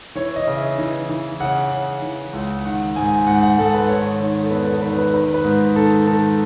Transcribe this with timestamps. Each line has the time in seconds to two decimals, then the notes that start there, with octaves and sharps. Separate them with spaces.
0.15 E3 C#5
0.36 D#5
0.47 C#3
0.57 E5
0.79 E3
1.09 E3
1.40 C#3 F#5
1.72 C#3
2.02 E3
2.33 C#2
2.65 D#3 F#5
2.96 G#2 G#5
3.26 G#2 F#5
3.43 F#5
3.58 G#2 A4
3.74 B4
3.89 D#3 C#5
4.20 D#3 C#5
4.43 A4
4.51 E2 B4
4.66 A4
4.82 D#3 B4
4.98 B4
5.13 D#3 B4
5.34 B4
5.44 G#2
5.76 D#3 A4
6.07 D#3 A4